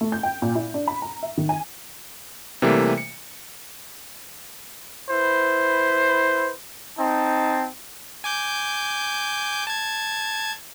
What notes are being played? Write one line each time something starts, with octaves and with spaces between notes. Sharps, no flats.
A3
G6
G5
A#2
E4
D4
B5
A#5
E5
D#3
G#5
C3 E3 G3 A3 A#3
C#7
E4 B4 C5
C4 D#4 A5
G#5 D6 G6
A5 G#6